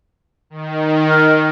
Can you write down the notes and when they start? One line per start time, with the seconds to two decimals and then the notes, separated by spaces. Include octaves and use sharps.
0.50 D#3
1.09 A#4